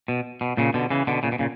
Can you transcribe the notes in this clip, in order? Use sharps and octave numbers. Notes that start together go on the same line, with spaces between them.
B2
B2
A#2 C#3
B2 D3
C#3 E3
B2 D3
A#2 C#3
B2
A#2 C#3